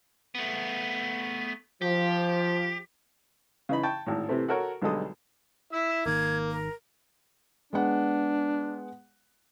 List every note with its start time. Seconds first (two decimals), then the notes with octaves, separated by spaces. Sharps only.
0.35 A3 B3
1.82 F3 G4
3.69 C#3 E3 D#4 B5
3.83 G5 A5 C#6
4.06 G#1 A2
4.29 C3 E3 A3 C4
4.48 F#4 A4 A#4 C#5
4.82 B1 D3 G3 G#3 A4 D#6
5.73 E4 E5 E6
6.06 G#1 D#3 A#3 G#6
6.51 A#4
7.73 G#3 B3 D4 F#5